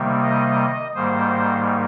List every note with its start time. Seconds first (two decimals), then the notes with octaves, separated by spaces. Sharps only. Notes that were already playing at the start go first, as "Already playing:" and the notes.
Already playing: C3 D#3 G3 A#3
0.22 D#5
0.95 G#2 D#3 G3 A#3 C5